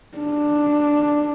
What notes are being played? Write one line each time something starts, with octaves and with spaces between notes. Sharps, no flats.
D4